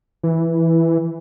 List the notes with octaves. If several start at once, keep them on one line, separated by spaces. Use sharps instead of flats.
E3